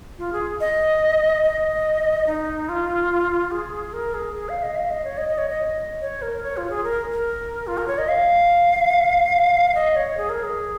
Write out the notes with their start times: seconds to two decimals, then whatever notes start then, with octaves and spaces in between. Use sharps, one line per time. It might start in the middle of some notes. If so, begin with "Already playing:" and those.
0.18 F4
0.33 G#4
0.60 D#5
1.43 D#5
2.27 D#4
2.69 F4
3.51 G#4
3.93 A#4
4.14 G#4
4.35 G#4
4.49 F5
4.63 D#5
4.76 F5
4.90 D#5
5.04 C#5
5.18 D#5
5.28 D#5
5.38 C#5
5.50 D#5
6.01 C#5
6.22 A#4
6.43 C#5
6.57 F4
6.70 G#4
6.84 A#4
7.12 A#4
7.67 F4
7.78 A#4
7.88 C#5
7.98 D#5
8.09 F5
9.75 D#5
9.96 C#5
10.17 G#4
10.29 A#4
10.43 G#4